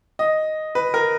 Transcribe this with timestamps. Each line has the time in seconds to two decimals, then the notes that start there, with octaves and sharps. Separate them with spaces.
0.19 D#5
0.75 B4
0.94 A#4